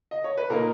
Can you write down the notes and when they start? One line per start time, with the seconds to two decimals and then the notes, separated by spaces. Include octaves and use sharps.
0.11 D#5
0.24 C#5
0.37 B4
0.50 A#2 A#3 D#4 A#4